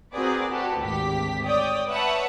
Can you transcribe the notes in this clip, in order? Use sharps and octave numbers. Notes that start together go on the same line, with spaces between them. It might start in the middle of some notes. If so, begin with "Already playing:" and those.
C4 F#4 G#4 A#4 B4 D5
F#4 G4 A4 B4
G#1 D2 G4 B6
C#5 D5 G5 D#6
B4 C#5 E5 F#5 A5